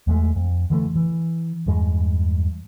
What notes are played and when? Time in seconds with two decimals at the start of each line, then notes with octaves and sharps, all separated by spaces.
0.07 E2 G#3 A3
0.36 F2
0.70 D3 E3 G#3 A3
0.96 E3
1.66 E2 G2 G#3